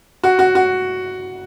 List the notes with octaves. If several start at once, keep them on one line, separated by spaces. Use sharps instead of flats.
F#4
F#4
F#4